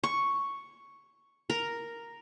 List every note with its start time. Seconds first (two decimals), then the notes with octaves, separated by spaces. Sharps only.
0.04 C#6
1.50 A#4